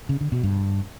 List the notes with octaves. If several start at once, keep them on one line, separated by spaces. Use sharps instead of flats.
C#3
D3
B2
G2